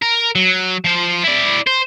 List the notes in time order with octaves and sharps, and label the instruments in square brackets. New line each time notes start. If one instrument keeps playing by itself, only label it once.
[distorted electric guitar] A#4
F#3
F3 C5
E4 D5
C5